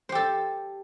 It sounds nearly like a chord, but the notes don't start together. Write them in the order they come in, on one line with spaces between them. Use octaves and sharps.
C5 G4 A4